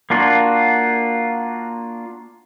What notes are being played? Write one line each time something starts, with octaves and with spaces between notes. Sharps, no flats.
A#3 D4 F4 F#4